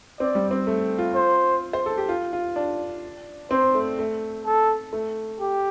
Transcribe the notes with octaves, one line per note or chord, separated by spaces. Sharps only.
C4 D5
G3
C4
A3
F4
C5
C5
A4
G4
F4
F4
D4
C4 C5
A3
A3
A4
A3
G4